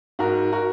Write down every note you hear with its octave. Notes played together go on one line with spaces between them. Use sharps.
G#2 F#4 A#4
F#4 A#4